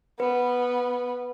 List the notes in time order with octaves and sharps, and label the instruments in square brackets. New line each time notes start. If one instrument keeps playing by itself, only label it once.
[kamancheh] B3 [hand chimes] B4